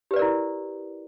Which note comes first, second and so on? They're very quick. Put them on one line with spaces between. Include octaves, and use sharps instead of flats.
G4 B4 D5 A#4 E4